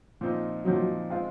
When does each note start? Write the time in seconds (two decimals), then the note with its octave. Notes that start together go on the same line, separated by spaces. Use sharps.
0.21 A#2 F3 C4 D#4
0.65 A#2 F3 F#3 C4 D#4
1.10 G#3 C4 F4